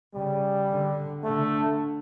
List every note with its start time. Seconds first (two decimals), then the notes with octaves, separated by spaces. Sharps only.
0.15 C#3 G3
0.69 D3
1.24 D3 A3